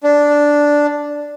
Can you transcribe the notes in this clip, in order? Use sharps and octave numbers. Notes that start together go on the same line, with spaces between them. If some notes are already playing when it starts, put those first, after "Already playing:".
D4